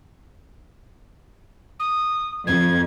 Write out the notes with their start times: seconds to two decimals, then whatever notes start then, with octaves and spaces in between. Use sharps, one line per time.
1.80 D#6
2.47 F2 G#6